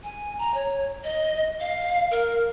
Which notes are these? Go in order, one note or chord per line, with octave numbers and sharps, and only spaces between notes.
G#5
A#5
C#5
D#5
F5
A#4